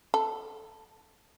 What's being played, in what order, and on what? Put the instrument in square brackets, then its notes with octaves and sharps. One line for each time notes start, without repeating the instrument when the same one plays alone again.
[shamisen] A4